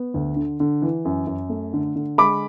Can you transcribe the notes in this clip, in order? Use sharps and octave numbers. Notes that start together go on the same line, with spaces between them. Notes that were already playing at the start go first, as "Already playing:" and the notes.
Already playing: B3
D2
D3
D3
E3
F#2
F#2
A3
D3
D3
G#3 B5 D6